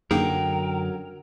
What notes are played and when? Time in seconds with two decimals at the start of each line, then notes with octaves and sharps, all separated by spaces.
0.11 F#2 D3 F#3 A#3 D#4 G#4 A#4 G5